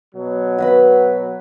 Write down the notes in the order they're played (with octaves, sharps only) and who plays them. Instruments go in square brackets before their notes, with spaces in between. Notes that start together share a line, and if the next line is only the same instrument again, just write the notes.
[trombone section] B2 F#3
[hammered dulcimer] F#4 B4 B5